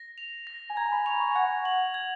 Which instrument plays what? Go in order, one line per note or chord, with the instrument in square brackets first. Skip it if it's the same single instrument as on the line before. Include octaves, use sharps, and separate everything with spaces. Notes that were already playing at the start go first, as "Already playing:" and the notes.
Already playing: [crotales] A#6
F7
A#6
[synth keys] G#5
[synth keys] A#5 [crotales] G#6
[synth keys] B5
[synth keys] C#6 [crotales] F7
[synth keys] C#6
G#5
[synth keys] F#5 [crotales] G#6
[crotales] F#7
G#6